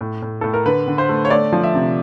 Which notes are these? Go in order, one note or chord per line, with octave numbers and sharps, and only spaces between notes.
A2
A2
A2 A4
A#4
D3 B4
D3
C5
A3
C#5
A3 D5
F3
E5
C3